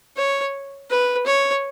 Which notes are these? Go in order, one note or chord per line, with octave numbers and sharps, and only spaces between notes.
C#5
B4
C#5